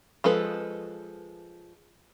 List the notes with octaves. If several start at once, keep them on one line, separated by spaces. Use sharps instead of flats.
F3 G#3 A4 B4